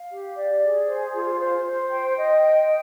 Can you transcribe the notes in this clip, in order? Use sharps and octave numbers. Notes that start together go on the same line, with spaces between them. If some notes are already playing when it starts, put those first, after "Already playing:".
Already playing: F5
G4
D5
G#4
C5
F4
C5
C5
G5
D#5
G5